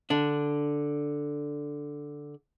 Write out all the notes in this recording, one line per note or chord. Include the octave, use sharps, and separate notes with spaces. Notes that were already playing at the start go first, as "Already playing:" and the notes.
D3 D4